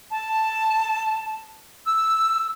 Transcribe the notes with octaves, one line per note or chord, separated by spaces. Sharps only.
A5
E6